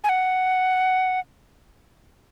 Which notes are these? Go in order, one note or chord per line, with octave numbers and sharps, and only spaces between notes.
G#5
F#5